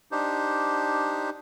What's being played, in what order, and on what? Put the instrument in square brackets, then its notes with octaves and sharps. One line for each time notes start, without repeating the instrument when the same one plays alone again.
[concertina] D4 D#4 G4 C5